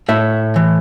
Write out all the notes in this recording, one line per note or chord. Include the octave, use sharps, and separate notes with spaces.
A2 E5
E3